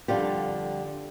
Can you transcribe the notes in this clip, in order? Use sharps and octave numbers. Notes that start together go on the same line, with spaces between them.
F2 D3 G3 F4 G4